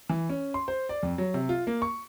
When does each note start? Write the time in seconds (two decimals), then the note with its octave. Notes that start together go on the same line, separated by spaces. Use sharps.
0.09 E3
0.30 C#4
0.54 C6
0.68 C5
0.89 D5
1.03 F2
1.18 F#3
1.34 C3
1.49 F4
1.67 A#3
1.82 C#6